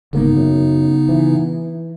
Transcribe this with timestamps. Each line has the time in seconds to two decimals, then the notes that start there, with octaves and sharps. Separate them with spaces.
0.13 G1 G#2 C#3 A#3 B3 D#4
0.37 F#2
1.09 E3